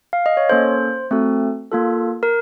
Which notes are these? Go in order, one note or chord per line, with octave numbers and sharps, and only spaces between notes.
F5
D#5
C#5
A#3 C#4 A4 C5
A3 C4 F#4 A4
A#3 F4 A4
A#4